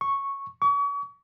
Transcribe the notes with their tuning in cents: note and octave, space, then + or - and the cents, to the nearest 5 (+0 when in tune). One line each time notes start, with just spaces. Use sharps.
C#6 -5
C#6 +40